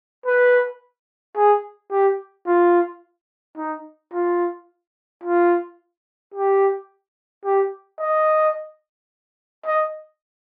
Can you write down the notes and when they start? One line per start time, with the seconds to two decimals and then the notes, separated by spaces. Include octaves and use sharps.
0.26 B4
1.36 G#4
1.91 G4
2.47 F4
3.57 D#4
4.13 F4
5.23 F4
6.34 G4
7.45 G4
8.00 D#5
9.66 D#5